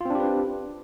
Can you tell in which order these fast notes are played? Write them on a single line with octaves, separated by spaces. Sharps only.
F4 C4 D4 G4 B4